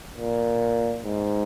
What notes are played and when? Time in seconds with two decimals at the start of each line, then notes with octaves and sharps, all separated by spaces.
0.18 A#2
1.05 G#2